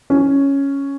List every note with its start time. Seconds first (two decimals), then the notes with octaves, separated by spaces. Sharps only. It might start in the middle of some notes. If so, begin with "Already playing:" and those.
0.10 C#4